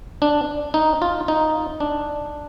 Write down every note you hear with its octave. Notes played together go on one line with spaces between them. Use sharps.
D4
D#4
F4
D#4
D4